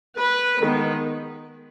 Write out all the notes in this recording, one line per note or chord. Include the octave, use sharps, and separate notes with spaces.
B4
D#3 G#3 B3